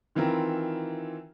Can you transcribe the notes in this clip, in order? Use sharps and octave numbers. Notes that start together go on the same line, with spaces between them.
D#3 E3 C4 F4 A#4